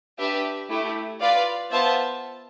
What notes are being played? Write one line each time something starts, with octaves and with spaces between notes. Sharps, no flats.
D4 G4 B4 E5
A3 E4 G4
F4 B4 D5 F5
B3 F4 C5 E5 A5